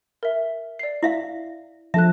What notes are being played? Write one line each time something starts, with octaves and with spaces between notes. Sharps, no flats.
A#4 E5
D5 C7
E4 E5 F5
F3 D4 A4 E5 A5 F#6